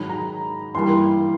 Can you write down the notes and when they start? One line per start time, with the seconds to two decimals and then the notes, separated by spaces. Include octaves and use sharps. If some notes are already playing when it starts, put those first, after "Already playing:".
Already playing: G#2 D#3 F#3 B5
0.10 A#5
0.75 G2 E3 G3 A#3 C6